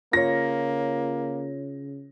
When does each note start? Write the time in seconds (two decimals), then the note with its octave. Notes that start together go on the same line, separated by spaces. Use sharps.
0.13 C#3 A#3 F4 C#5 A#6